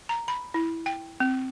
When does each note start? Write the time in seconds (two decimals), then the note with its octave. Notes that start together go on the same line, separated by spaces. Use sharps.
0.09 A#5
0.28 B5
0.54 E4
0.86 G5
1.20 C4